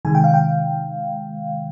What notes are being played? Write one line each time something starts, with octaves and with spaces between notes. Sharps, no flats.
C3 D#3 G#3 G#5
G5
F5
G5